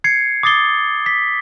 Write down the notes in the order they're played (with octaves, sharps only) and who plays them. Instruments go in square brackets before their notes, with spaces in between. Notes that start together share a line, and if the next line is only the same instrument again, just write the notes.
[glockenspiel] G#6 C7 C#7
D6 D#6 A6 C7 G7
B6